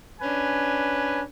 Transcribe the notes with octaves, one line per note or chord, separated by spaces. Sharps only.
C#4 D4 B4 G#5